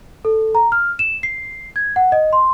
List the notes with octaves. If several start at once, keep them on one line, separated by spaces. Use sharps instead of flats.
A4
A#5
F6
E7
C7
G#6
F#5
D#5
C6